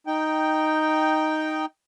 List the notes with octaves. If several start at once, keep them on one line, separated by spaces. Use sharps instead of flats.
D#4 G5